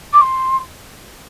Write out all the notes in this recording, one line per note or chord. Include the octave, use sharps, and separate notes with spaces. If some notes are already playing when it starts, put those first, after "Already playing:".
D6
C6